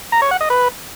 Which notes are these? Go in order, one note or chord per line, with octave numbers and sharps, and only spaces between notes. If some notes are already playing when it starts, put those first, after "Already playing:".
A#5
C#5
F#5
D#5
B4